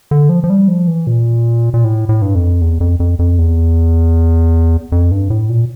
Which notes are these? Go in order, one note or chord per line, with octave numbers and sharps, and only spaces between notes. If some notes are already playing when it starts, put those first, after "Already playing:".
D3
F3
F3
G3
F3
E3
A#2
A#2
A2
A2
G2
F2
E2
F2
F2
F2
E2
F2
G2
A2
A#2